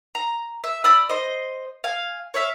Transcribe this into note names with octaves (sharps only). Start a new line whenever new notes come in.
A#5
E5
D5 B5 D#6 E6
C5 D#5
F5 G#5
C#5 D5 E5 F5